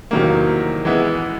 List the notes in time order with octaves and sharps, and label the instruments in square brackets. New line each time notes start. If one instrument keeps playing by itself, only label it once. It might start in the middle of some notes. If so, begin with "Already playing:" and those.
[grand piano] E2 C3 D#3 F#3 A#3
E3 G#3 B3 E4